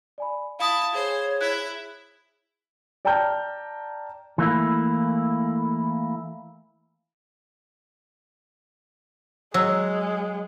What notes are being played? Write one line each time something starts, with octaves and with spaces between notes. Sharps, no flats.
D5 G#5 B5
E4 F5 A5 B5 D#6
G#4 C5 C#5
E4 F#6
D5 G5 A5 A#5 F6 G6
E3 A3 A#3 E4
F#3 G#3 E6